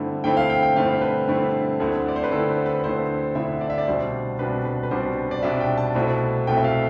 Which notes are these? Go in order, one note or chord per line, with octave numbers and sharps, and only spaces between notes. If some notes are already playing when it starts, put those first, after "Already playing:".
Already playing: G2 D3 A3 C4 E4
G2 D3 A3 C4 E4 G5
F5
G5
G5
G2 D3 A3 C4 E4 F5
B4
G2 D3 A3 C4 E4
D2 D3 A3 C4 E4
D5
C5
B4
D2 D3 A3 C4 E4 A4
B4
B4
B4
D2 D3 A3 C4 E4 C5
D2 D3 A3 C4 E4 E5
D5
E5
D5
C2 B2 G3 D4 C5
C2 B2 G3 D4 B4
B4
B4
C2 B2 G3 D4 C5
D5
C2 B2 G3 D4 E5
G5
A5
C2 B2 A3 C4 E4
C2 B2 A3 C4 E4 G5
E5
F5